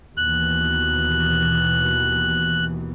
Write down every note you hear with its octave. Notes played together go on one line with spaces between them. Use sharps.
D#2 B2 E3 F#6